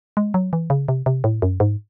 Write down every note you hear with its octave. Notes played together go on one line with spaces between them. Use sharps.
G#3
F#3
E3
C#3
C3
C3
A2
F#2
G#2